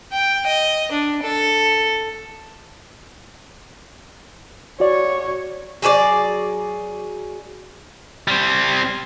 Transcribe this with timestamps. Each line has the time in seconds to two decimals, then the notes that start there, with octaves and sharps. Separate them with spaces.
0.12 G5
0.46 D#5
0.92 D4
1.22 A4
4.80 F#4 C#5 D5
5.82 F#3 G#4 C5 D5
8.28 G3 C4